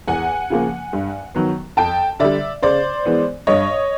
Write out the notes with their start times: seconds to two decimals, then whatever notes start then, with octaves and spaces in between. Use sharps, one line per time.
0.08 E2 F#5 G#5
0.50 C#3 F3 A#3
0.93 G2
1.35 D#3 F#3 B3
1.77 F2 G5 A5
2.20 D3 G3 D5 E5
2.63 C#3 C5 D5
3.05 E3 G#3 B3
3.47 G2 C#5 D#5